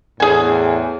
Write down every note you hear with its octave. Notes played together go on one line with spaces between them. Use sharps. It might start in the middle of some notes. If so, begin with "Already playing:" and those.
E2 A2 G#4 G#5